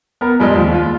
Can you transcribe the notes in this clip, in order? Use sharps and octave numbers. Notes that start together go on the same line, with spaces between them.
B3 A#4
F2 G3 G#3
D#2 F3
F4